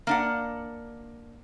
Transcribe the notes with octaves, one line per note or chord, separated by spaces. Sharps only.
A#3 D4 F#5